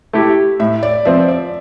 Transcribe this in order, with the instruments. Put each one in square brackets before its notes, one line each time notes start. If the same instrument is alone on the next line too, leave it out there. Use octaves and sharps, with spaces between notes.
[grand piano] A3 E4 G4
[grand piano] A2 [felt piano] E5
[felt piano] D5
[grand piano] F3 C4 [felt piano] E5
[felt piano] D5